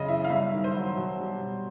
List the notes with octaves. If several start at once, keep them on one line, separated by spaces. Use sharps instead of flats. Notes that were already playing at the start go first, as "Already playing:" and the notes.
Already playing: F#2 C#3 D#5
E3 E5
F5
G2 E5
D#3
C5
F#3
B2
G3
B2